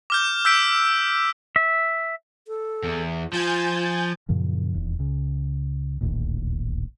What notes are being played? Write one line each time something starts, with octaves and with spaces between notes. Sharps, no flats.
D6 F6 G6
E6 G6 B6 D7
E5
A4
E2
F3 F4 G#5 G6 A6
F#2 A#2 C#3 F3
D#1 E2
C#2 C#3
D1 A1 D#2 A#2